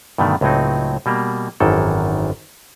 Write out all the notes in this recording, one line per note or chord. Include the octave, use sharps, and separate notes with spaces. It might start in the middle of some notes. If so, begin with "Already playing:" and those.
G2 B2 D3 D#3 A3
C#2 A2 F#3 C4 D#4
B2 G3 A#3
G#1 F#2 D#3 E3 A4